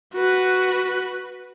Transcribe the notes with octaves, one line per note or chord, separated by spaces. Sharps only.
F#4 B4